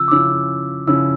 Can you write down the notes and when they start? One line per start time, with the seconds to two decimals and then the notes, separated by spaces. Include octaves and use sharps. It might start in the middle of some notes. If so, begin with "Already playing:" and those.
Already playing: C#3 F3 E6
0.08 D6
0.11 C#3 F3 C#4 E4 E6
0.87 C#3 F3 C#4 E4 E6